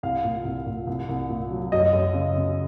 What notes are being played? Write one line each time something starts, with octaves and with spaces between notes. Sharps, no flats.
C2 F5
A#2
C2
A#2
C2
C2
A#2
F#3
F#2 D#5
F#2
C#3
C#3